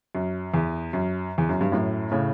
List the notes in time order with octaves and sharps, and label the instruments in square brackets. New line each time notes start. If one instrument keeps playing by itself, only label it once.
[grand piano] F#2
E2
F#2
E2
F#2
G2
F#2 A2
A2 C#3